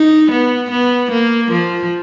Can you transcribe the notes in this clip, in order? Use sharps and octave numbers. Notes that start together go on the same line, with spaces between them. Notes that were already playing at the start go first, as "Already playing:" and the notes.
Already playing: D#4
B3
B3
A#3
F3